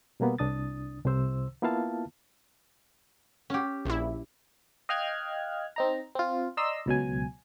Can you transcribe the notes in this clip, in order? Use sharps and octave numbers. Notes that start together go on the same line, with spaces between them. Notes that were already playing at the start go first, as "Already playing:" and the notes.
B2 G3 A#3 B3
C2 D4 D#6 A6
C2 C3 C5 E6
A#3 B3 E4 F4 F5 A5
C#4 G4
A#1 E4
D#5 F5 G5 F6 F#6 G#6
C4 D#4 A#5
C4 F4
D5 D#5 A#5 C6 E6
C#2 B2 F#3 G#5